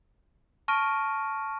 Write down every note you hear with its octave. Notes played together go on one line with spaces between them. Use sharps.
A5 C#6 F6 A#6 D7 D#7